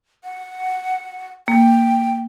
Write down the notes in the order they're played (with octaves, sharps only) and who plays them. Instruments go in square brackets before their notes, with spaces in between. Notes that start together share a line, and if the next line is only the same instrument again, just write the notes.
[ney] F#5
[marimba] A#3 [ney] G5